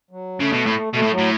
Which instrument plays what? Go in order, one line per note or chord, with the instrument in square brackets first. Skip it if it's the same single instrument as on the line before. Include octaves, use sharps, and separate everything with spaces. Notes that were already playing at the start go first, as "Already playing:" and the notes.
[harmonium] F#3
[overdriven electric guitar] C#3 [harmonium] A3
[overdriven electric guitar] B2
A2
[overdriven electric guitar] B2 [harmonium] A3
[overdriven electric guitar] A2
[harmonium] F#3
[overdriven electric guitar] A2